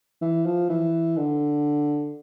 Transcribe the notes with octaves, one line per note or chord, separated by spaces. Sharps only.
E3
F3
E3
D3